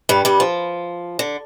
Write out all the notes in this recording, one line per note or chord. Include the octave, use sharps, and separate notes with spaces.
G2 G3
G2 G3
F3
D3